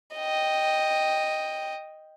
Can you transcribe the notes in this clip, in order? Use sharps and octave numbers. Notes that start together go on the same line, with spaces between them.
D#5 G5